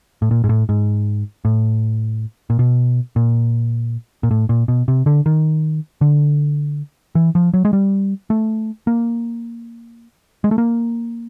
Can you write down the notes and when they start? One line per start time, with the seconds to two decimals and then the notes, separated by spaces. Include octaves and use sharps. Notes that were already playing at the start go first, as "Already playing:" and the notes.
0.22 A2
0.31 A#2
0.44 G#2
0.49 A2
0.69 G#2
1.45 A2
2.50 A#2
2.59 B2
3.16 A#2
4.23 A#2
4.31 A2
4.49 A#2
4.68 B2
4.88 C3
5.06 D3
5.26 D#3
6.01 D3
7.15 E3
7.35 F3
7.54 F#3
7.65 G#3
7.73 G3
8.30 A3
8.87 A#3
10.44 G#3
10.51 A3
10.58 A#3